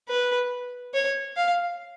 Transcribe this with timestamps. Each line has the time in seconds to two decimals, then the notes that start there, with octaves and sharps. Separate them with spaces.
0.09 B4
0.94 C#5
1.37 F5